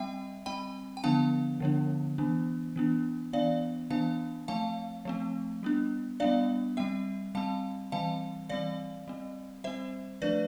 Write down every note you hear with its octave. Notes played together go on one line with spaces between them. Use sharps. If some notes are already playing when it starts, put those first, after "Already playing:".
Already playing: G3 C4 E5 G5
G3 C4 G5 B5
G5
D3 F3 B3 D4 F5 A5
D3 F3 B3 D4
E3 B3 D4
E3 B3 D4
E3 B3 D4 D5 F5
E3 B3 D4 F5 A5
F3 A3 C4 F5 A5
F3 A3 C4
G3 B3 D4
G3 B3 D4 D5 F5
G3 C4 E5 G5
G3 C4 F5 A5
E3 G3 C4 F5 A5
E3 G3 C4 D5 F5
G3 C4
G3 C4 C5 E5
F3 A3 D4 B4 D5